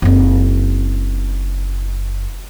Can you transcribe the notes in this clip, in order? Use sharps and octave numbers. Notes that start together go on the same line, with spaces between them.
F#1 C4